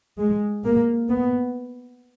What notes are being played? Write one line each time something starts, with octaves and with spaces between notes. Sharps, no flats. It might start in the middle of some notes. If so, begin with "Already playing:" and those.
G#3
A#3
B3